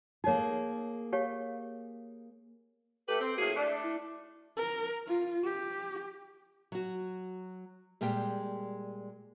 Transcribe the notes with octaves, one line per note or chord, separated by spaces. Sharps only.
A#3 D#4 G#4 C#5
G4 C#5 F5
A3 G4 A4 B4
C4
A2 A#3 F#4 G#4
A3 D4 D5
E4
A#4
F4
G4
F#3 F#4
A#2 G3 G#3 G4 G5